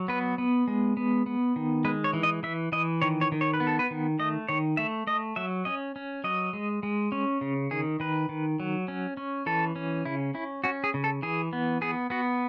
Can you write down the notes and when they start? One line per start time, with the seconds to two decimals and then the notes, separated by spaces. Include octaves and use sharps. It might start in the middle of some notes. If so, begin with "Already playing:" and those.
Already playing: F#3
0.08 B3 B4
0.38 B3
0.68 G#3
0.97 B3
1.26 B3
1.56 D#3
1.85 G#3 B4
2.04 C#5
2.13 E3
2.23 D#5
2.43 E3 E5
2.72 E3 D#5
3.02 D#3 C#5
3.21 C#5
3.32 D#3
3.41 C#5
3.54 B4
3.60 B3
3.67 A4
3.79 B4
3.91 D#3
4.19 A3 D#5
4.49 D#3 C#5
4.77 A3 E5
5.07 A3 D#5
5.36 F#3 E5
5.65 C#4 D#5
5.96 C#4
6.24 F#3 D#5
6.53 G#3
6.83 G#3
7.12 C#4
7.41 C#3
7.71 D#3 G#4
8.00 D#3 B4
8.29 D#3
8.60 F#3
8.88 C#4
9.17 C#4
9.46 E3 A4
9.76 C#4
10.05 C#3 E4
10.34 C#4 E4
10.64 C#4 F#4
10.84 G#4
10.94 C#3
11.04 A4
11.22 E3 G#4
11.53 B3
11.81 B3 G#4
12.10 B3 F#4